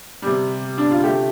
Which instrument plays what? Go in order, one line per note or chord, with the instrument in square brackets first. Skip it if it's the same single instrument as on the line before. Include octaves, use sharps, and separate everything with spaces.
[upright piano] C3 G3
D4
F4
C3 A3 G4